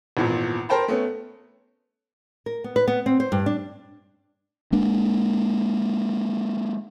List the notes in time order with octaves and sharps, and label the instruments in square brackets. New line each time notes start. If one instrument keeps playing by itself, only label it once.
[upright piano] G#1 E2 A#2
A#4 C5 G5 A5 B5
A3 B3 C#4
[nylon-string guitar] A#4
B3
B4
B3
C4
C5
G2
D4
[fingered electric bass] G#3 A#3 D4